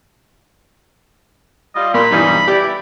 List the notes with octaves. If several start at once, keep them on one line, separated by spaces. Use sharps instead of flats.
G3 F4 D#5
A#2 A#3 B5 C6
B1 G2 C3 E3 G3 D#4
E3 E4 G4 D5